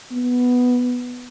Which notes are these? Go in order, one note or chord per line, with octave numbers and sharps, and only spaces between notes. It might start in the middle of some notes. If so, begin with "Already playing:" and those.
B3